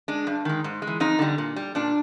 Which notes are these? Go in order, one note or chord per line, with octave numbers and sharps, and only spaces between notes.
G#3 D4
G2
D#3 G#3
G#2
G#3
E3
F2 D#4
D3 G3
A#2
G3
A#2 D4